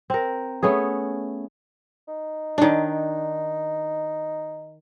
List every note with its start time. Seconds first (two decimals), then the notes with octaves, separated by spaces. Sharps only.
0.10 C4 A#4
0.63 A3 B3 C#4 G#4
2.08 D#4
2.58 D#3 D4